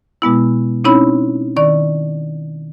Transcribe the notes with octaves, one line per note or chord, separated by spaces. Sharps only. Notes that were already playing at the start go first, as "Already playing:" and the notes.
B2 G#3 B3 E4
C4 C#4 D#4 E4 C#5 B5
D#3 D5 C#6